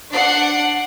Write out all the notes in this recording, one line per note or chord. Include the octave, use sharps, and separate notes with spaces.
D4 F#5 C7 D7